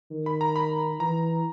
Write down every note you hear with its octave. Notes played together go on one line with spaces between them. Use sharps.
D#3
B5
A#5
B5
E3 A#5